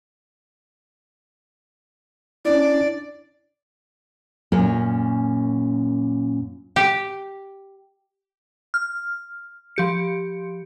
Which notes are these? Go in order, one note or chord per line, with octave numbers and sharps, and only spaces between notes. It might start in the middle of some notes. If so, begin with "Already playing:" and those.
C#4 D4 E4 D5
F#2 A#2 C#4 A#4
G4
F6
F3 G4 C#7